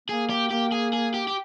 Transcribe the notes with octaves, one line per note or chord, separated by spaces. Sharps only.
A#3 G#4
G4
A#3 G4
G#4
G#4
G4
G4